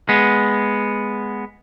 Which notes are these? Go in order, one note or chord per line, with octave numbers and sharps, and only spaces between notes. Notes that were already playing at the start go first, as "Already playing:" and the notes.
G#3 B3